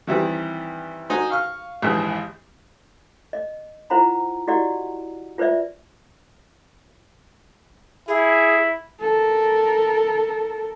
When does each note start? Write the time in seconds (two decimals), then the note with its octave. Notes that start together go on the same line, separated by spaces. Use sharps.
0.07 D#3 E3 G3 C4
1.10 D#4 F#4 C5 G#5
1.30 F5 C#6 F6
1.82 A#1 D#2 G#2 E3
3.33 D#5
3.90 E4 F4 C5 F#5 A#5 B5
4.48 E4 F#4 G4 D5 D#5 F#5
5.38 F4 B4 C5 D5 E5
8.08 E4 G#4
9.01 A4 A#4